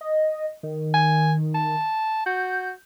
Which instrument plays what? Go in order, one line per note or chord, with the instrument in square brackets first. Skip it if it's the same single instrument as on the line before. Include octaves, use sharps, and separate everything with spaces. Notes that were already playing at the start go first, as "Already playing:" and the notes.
[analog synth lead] D#5
D#3
[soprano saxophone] G#5
A5
[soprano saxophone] F#4 [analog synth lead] G6